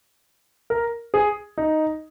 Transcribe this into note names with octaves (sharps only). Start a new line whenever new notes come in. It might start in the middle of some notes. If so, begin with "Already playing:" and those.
A#4
G#4
D#4